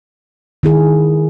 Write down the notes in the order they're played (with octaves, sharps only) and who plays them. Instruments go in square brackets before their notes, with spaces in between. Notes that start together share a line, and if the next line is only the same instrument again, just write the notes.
[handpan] D#3 E4 G#4